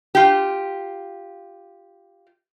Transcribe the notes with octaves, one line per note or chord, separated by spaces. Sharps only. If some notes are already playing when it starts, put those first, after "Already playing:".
F4 G4